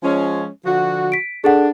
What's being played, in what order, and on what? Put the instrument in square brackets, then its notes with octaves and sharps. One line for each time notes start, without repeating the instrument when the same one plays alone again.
[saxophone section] F3 G#3 C#4
D3 F3 F#4
[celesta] B6 D7
[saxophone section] D4 [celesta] G#4 A4 F#5